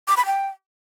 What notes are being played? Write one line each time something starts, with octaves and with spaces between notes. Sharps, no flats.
D6
B5
G5